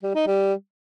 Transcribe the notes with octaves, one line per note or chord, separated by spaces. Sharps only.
G3
D#4
G3